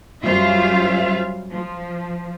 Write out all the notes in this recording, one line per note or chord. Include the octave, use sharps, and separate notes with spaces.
F#2 G3 F4 C5 E5 F5
F3